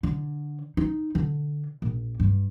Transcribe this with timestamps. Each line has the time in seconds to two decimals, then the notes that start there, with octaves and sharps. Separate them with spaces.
0.03 D3
0.77 D#4
1.15 D3
1.82 A#1
2.20 G2